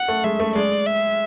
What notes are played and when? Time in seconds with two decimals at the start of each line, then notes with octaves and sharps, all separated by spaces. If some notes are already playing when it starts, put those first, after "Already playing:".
Already playing: F#5
0.08 A3
0.24 G#3 E5
0.40 A3
0.55 G#3 D5
0.86 E5